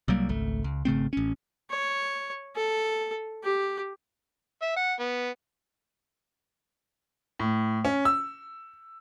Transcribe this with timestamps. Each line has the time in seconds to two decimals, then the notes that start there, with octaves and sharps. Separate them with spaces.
0.08 C2 F#3 G3 A#3
0.29 G#1 C#2 A3
0.64 C#2
0.85 G#1 C#3 A3 C4
1.13 A1 C#4
1.70 C#5
2.55 A4
3.43 G4
4.62 E5
4.77 F#5
5.00 B3
7.39 A2
7.85 C#4
8.05 E6